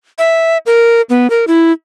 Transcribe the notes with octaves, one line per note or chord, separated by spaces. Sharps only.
E5
A#4
B3
A#4
E4